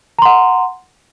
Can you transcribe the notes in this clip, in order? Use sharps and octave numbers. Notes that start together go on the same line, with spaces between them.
F#5 A#5 C6